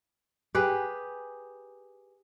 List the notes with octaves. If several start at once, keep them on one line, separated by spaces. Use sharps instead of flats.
G4 G#4 B4